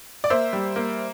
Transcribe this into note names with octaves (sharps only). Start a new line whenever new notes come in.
D5
A#3 C5 E5
G3
A#3